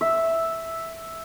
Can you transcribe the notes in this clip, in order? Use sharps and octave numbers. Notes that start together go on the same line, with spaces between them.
E5